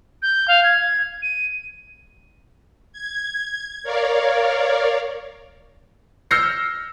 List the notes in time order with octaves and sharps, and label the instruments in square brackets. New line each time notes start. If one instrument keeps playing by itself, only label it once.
[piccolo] G6
F5
G#6
D#7
[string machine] G#6
A#4 C#5 D5 F5
[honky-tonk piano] E6 F6 G6 A#6 C7 C#7